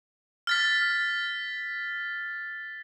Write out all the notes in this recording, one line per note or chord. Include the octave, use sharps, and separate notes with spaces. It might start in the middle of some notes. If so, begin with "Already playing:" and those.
F6 A6 B6